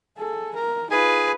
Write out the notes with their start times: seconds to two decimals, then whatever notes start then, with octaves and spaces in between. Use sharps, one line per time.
0.18 G#4 A4
0.55 A#4
0.91 D#4 F4 G#4 B4 G#5